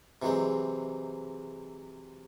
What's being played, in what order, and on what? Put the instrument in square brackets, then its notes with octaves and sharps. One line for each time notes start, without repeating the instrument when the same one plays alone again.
[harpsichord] C3 E3 F#3 G#3 C4